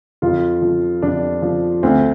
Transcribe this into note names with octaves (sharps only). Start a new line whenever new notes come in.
F2 F4
F3
F2 D4
F3
D2 C4